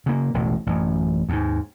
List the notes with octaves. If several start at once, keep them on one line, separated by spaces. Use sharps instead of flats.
C#3 A#3
E1 A1 A2
A1 F#2
D#2 G#2